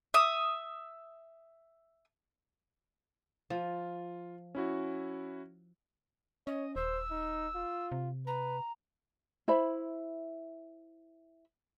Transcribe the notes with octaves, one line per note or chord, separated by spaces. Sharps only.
E5 D#6
F3 F4
C#4 E4 F#4
C#4 C#5 D#5
D#1 C5 E6
D#4
F4
C3
B4 A#5
E4 C5 E5 B5